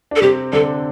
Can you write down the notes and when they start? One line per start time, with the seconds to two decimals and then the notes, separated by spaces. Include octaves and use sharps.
0.11 D4 A4
0.22 C3 C4 G4
0.52 D3 D4 A4